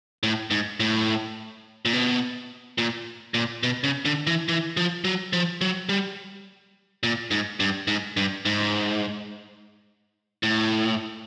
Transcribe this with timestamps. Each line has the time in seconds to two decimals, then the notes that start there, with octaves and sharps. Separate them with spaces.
0.23 A2
0.51 G#2
0.80 A2
1.85 A#2
1.93 B2
2.78 A#2
3.34 A#2
3.63 B2
3.84 C#3
4.05 D3
4.27 E3
4.49 E3
4.77 F3
5.04 F#3
5.33 F3
5.61 F#3
5.89 G3
7.03 A#2
7.31 G#2
7.60 G2
7.88 G#2
8.17 G2
8.45 G#2
10.43 A2